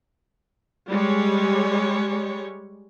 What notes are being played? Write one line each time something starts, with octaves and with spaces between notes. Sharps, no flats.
G3 G#3 C#5